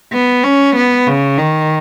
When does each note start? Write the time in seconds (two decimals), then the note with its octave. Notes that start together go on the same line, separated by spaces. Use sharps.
0.13 B3
0.44 C#4
0.76 B3
1.07 C#3
1.38 D#3